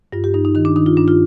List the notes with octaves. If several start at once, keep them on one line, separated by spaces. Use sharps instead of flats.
G2 F4
G4
G2 D#4
D#4
D#3 D#4
D4
D#3 D#4
F4
G2 D4
F4